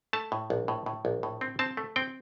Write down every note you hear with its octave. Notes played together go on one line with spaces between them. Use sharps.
A3 A5
A2
A#1
A2
A2
A#1
A2
C4
C4 A5
A3
C4 G5